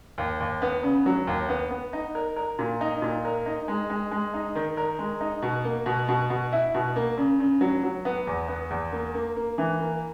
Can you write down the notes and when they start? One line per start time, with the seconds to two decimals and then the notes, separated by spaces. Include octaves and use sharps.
0.18 D#2
0.40 D#2
0.62 B3
0.83 C#3
1.06 F#3
1.27 D#2
1.49 B3
1.71 B3
1.93 D#4
2.15 A#4
2.36 A#4
2.59 A#2
2.81 D#4
3.02 A#2
3.25 A#4
3.46 D#4
3.68 G#3
3.90 G#3
4.11 G#3
4.34 D#4
4.55 D#3
4.77 A#4
4.99 G#3
5.21 D#4
5.43 B2
5.65 A#3
5.86 B2
6.09 B2
6.30 B2
6.53 E4
6.75 B2
6.96 A#3
7.18 C#3
7.40 C#3
7.61 F#3
7.83 F#3
8.05 B3
8.27 E2
8.48 B3
8.70 E2
8.92 A#3
9.14 A#3
9.36 A#3
9.58 E3
9.80 A#3